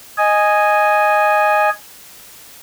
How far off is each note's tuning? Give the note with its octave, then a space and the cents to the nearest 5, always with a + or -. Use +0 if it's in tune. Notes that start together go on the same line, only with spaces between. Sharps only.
D#5 -5 G#5 +0